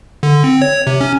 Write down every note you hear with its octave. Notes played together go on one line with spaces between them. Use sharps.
D3
C4
C#5
C3
C#4